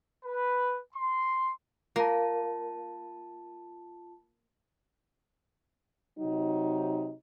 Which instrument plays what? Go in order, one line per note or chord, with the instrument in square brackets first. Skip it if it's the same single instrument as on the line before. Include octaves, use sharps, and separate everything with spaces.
[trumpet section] B4
C6
[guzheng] A#3 [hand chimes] F4 A5
[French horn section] C3 F#3 D#4